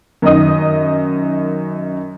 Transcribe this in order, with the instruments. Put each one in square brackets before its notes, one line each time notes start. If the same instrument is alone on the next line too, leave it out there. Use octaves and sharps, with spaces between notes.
[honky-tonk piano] F#2 D#3 D#4 D#5 D#6